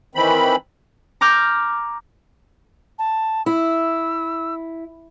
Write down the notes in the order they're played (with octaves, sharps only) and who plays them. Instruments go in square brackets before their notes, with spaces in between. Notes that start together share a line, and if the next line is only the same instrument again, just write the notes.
[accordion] D#3 E3 C4 B5
[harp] A#5 D6 F6 G6 G#6
[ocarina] A5
[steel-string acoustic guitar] E4 [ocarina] E6